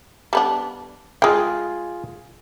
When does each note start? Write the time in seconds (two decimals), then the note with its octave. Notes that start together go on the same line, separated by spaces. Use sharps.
0.33 G3 B3 D4
1.22 G#3 F4 G#4 F5 G5